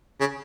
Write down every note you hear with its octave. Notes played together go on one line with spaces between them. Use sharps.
C#3